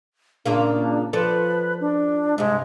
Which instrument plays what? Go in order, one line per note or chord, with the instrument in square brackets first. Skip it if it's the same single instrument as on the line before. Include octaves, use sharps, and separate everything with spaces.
[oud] A#2 C#3 A#3 [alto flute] D4
[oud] F3 A4 D5 [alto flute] B4
[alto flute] D4
[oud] G2 C3 [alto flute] G#3